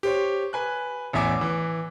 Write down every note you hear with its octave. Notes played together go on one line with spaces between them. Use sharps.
G4 C5 C#5
B4 G#5 F#6
A1 E2 E5 G#5 D6
E3